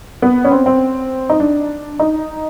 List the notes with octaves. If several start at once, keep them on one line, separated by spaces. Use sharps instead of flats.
B3
C#4
C4
C4
D#4
D4
D#4